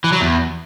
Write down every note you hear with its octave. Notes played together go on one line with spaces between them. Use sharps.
E3
F#3
E2